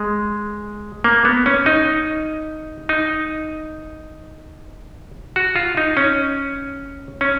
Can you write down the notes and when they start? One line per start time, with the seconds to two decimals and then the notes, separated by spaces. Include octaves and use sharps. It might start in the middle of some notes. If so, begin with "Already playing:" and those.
Already playing: G#3
1.04 A#3
1.25 B3
1.46 C#4
1.66 D#4
2.89 D#4
5.36 F#4
5.56 F4
5.77 D#4
5.97 C#4
7.21 C#4